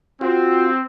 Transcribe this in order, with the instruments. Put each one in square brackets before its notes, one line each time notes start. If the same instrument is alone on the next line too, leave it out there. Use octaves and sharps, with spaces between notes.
[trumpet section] C4 [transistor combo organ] F4 F#4